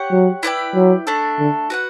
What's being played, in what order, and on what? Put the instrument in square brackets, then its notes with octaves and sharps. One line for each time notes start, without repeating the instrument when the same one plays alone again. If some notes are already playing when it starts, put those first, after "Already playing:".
Already playing: [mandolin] G4 C#5 F#5
[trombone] F#3
[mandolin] E4 B4 D5 G5
[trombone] F#3
[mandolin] A3 D4 A4
[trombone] D3
[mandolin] F#4 B4 F#5